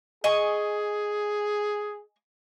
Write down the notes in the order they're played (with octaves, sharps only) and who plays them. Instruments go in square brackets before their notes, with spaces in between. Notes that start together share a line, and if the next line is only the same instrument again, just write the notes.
[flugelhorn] G#4 [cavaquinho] D#5 G#5 C#6